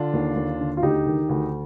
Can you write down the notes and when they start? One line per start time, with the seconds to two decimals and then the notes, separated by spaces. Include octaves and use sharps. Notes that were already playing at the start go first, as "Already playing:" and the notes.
Already playing: D3 D4 F4
0.13 D#2
0.36 D#2
0.60 D3
0.77 F4
0.82 D2 D#4 G4
1.06 D#3
1.29 D2